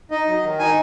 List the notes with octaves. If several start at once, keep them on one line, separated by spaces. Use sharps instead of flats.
D#4 D#5
F#3
D#3
D#4 G#5